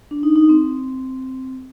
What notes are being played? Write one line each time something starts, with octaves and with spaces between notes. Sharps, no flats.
D4
D#4
D#4
C4